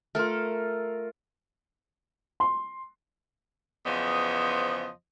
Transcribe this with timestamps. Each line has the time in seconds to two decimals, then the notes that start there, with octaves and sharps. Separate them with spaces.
0.15 A3 F4 A4 A#4
2.40 C6
3.86 E2 C#3 F3 B3 C5 D#5